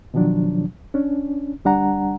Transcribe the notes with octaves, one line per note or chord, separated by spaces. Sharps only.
B2 D#3 F3 F#3 D4
C#4 D4
D2 G3 D4 F#5 A#5